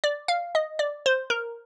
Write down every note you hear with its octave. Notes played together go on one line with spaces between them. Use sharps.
D5
F5
D#5
D5
C5
A#4